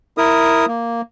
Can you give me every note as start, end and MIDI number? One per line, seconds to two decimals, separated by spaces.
0.18 0.66 64
0.18 0.66 70
0.18 0.66 87
0.68 1.01 58